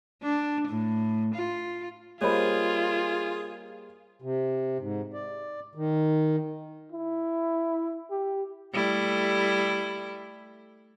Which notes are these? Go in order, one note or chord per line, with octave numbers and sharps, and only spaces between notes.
D4
A2
F4
G3 A#3 F4 G#4 C5 C#5 D#5 B5
C3
G#2
D5
D#3
E4
G4
G3 A3 E4